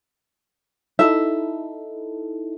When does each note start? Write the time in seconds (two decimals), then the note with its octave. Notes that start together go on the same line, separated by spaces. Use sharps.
0.99 D#4 E4 A4 E5